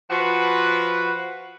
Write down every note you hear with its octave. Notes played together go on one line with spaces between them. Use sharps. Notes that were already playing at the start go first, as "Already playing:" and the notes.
F3 F#4 B4